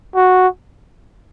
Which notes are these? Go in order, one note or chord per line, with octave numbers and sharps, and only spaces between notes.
F#4